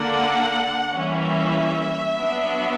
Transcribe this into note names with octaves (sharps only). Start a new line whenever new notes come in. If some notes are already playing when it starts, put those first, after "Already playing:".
Already playing: D3 A#3 D4 F#5
E3 G3 A#3 C#4 E5
F#3 B3 D4